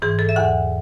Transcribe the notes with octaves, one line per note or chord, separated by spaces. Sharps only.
G#2 E3 G#4
A4
E5
E2 D3 F#5